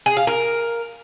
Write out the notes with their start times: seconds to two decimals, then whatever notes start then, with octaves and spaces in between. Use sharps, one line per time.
0.06 G#4
0.17 F5
0.27 A#4